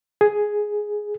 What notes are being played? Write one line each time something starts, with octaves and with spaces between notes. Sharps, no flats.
G#4